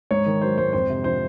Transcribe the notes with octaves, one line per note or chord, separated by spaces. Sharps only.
G#2 C#5
D#3
F#3 C5
G#2 C5
F2 C5
C3
F3 C5